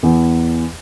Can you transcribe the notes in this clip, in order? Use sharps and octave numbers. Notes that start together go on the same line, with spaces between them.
E2